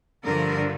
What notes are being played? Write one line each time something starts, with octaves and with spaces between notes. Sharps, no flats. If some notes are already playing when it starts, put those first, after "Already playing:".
G2 D3 F3 A#4